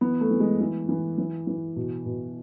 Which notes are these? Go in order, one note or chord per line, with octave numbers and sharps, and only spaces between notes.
E3 B3
A3
E3
G#3
E3
E3
E3
E3
B2
B2